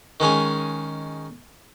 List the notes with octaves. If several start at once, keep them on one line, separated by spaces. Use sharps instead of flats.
D#3 G#3 C#4 G#5